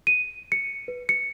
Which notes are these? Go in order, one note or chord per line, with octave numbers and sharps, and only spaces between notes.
D#7
C#7
B4
C#7